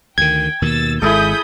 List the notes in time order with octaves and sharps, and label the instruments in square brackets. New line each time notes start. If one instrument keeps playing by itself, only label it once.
[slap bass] D2 D#3 [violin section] G5 [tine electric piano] G#6
[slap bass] D#2 B2 D#3 [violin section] E6 A6
[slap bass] G#1 G#3 [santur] E4 G#4 A4 [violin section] B5 D#6 G6